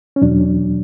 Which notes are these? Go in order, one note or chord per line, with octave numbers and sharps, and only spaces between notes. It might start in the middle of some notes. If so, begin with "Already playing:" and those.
C#4
E2 B2 F#3 D4